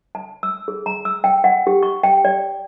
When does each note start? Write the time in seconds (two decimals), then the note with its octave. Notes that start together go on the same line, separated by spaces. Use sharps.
0.15 A5
0.43 E6
0.68 G#4
0.86 A#5
1.05 E6
1.24 G5
1.44 F#5
1.67 G4
1.83 C#6
2.03 G5
2.25 D5